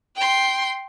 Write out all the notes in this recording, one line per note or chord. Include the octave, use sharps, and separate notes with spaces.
G5 C6